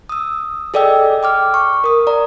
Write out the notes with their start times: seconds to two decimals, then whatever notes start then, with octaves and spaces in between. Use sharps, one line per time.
0.09 D#6 E6
0.74 G#4 A4 D5 D#5 G5 E6
1.23 G5 D6 F6
1.54 C#6
1.84 A#4 D#6
2.07 D5 A#5